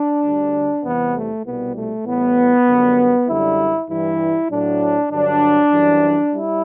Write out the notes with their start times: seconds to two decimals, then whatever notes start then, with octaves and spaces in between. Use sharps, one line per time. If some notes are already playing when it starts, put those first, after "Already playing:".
Already playing: D4
0.23 D2 D3 G3
0.83 E2 C3 E3 G3 B3
1.14 A3
1.45 C2 B2 G3 B3
1.75 A3
2.06 A2 E3 G3 B3
2.66 F#2 D3 G3
3.28 F#2 D3 G3 E4
3.89 G2 E3 G3 E4
4.50 A2 F#3 D4
5.10 G2 D3 F#3 D4
5.72 F#2 E3 G3
6.32 G3 E4